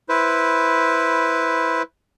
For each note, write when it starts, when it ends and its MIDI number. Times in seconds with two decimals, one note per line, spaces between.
0.09 1.82 64
0.09 1.82 71
0.09 1.82 72